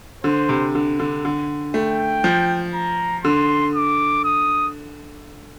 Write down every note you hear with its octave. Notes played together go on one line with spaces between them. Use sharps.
D3 C5
C3
D3
D3
D3
A3 G5
F3
A#5
D3 C6
D6
D#6